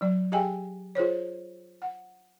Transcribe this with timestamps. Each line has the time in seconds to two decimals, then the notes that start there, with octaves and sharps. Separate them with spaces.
0.01 F#3 D5
0.32 G4 G#4 D#5 F5 G5 G#5
0.95 F4 G#4 C5 C#5
1.82 F#5